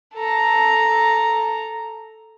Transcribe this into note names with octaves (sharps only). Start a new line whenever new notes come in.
A4 A#5